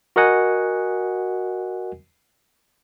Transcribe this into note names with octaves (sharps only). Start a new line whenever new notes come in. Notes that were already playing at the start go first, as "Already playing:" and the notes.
F#4 A#4 D#5 F#5 G#5